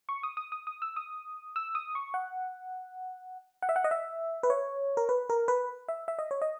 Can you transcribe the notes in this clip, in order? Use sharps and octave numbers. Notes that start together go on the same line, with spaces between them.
C#6
D#6
D#6
D#6
D#6
E6
D#6
E6
D#6
C#6
F#5
F#5
E5
F#5
D#5
E5
B4
C#5
A#4
B4
A#4
B4
E5
E5
D#5
C#5
D#5